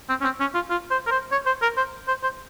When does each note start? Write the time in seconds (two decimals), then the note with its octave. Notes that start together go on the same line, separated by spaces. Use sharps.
0.09 C4
0.21 C#4
0.24 C4
0.40 C#4
0.54 F4
0.70 F4
0.91 C5
1.07 A#4
1.11 C5
1.32 C#5
1.46 C5
1.62 A#4
1.77 C5
2.08 C5
2.23 C5